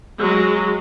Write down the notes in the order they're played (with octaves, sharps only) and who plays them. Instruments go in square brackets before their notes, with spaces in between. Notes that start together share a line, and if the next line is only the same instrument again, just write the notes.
[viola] F#3 G#3